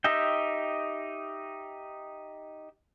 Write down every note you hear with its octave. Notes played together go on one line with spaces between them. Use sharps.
D#4 G4 D#5 E5 G5